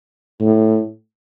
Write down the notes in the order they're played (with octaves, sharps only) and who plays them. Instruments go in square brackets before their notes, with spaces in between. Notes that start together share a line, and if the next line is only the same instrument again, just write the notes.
[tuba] A2